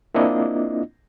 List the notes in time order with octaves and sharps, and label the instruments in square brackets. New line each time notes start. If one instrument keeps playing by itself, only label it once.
[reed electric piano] A#3 C4 D4 E4 F4 D#5